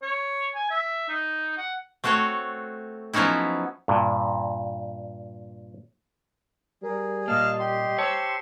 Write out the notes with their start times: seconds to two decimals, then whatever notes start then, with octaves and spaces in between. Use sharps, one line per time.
0.02 C#5
0.55 G#5
0.70 E5
1.09 D#4
1.58 F#5
2.04 A3 C4 F#4 A4 C#5
3.13 F3 F#3 B3 C#4 D#4 E4
3.88 G2 A#2
6.83 G3 G#4 A#4
7.28 A#2 A#3 D#5 F5 A5 F6
7.59 G4 C6
7.98 C5 C#5 A5 E6